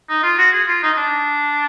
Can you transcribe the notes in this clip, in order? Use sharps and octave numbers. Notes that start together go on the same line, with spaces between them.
D#4
F4
F#4
G#4
F4
D#4
D#4
D4